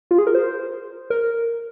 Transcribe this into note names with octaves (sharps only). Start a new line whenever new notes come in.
F4
G#4
A#4
C5
A#4